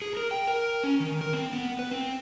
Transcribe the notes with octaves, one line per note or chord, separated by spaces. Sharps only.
G#4
A#4
G5
A#4
C#4
D#3
A#4
C4
B3
B4
C4